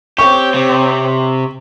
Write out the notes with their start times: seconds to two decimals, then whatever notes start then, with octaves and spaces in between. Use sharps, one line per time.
0.19 C4 G4 C#5 C#6
0.54 C3